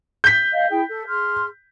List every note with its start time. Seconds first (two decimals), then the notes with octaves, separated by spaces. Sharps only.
0.24 G6 B6
0.53 D#5 F5
0.70 E4 G#4 G5
0.90 A4
1.07 G#4 C6 F6